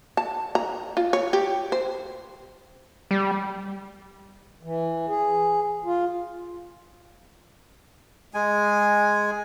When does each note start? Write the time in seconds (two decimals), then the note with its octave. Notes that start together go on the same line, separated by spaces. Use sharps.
0.17 A5
0.55 A#5
0.97 F4
1.13 C#5
1.33 G4
1.72 C5
3.11 G3
4.63 E3
5.08 G#4
5.85 F4
8.34 G#3 G#5